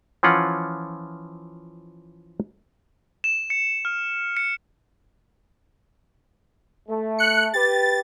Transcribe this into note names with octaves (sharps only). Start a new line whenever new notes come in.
E3 F3 C#4 F4 F#5
E7
C#7
F6
C#7
A3
F#6 C#7
G4 B4 A6